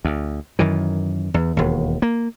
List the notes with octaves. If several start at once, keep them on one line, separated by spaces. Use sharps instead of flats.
D2
F#2 D#3 E3
E2
E1 D#2
A#3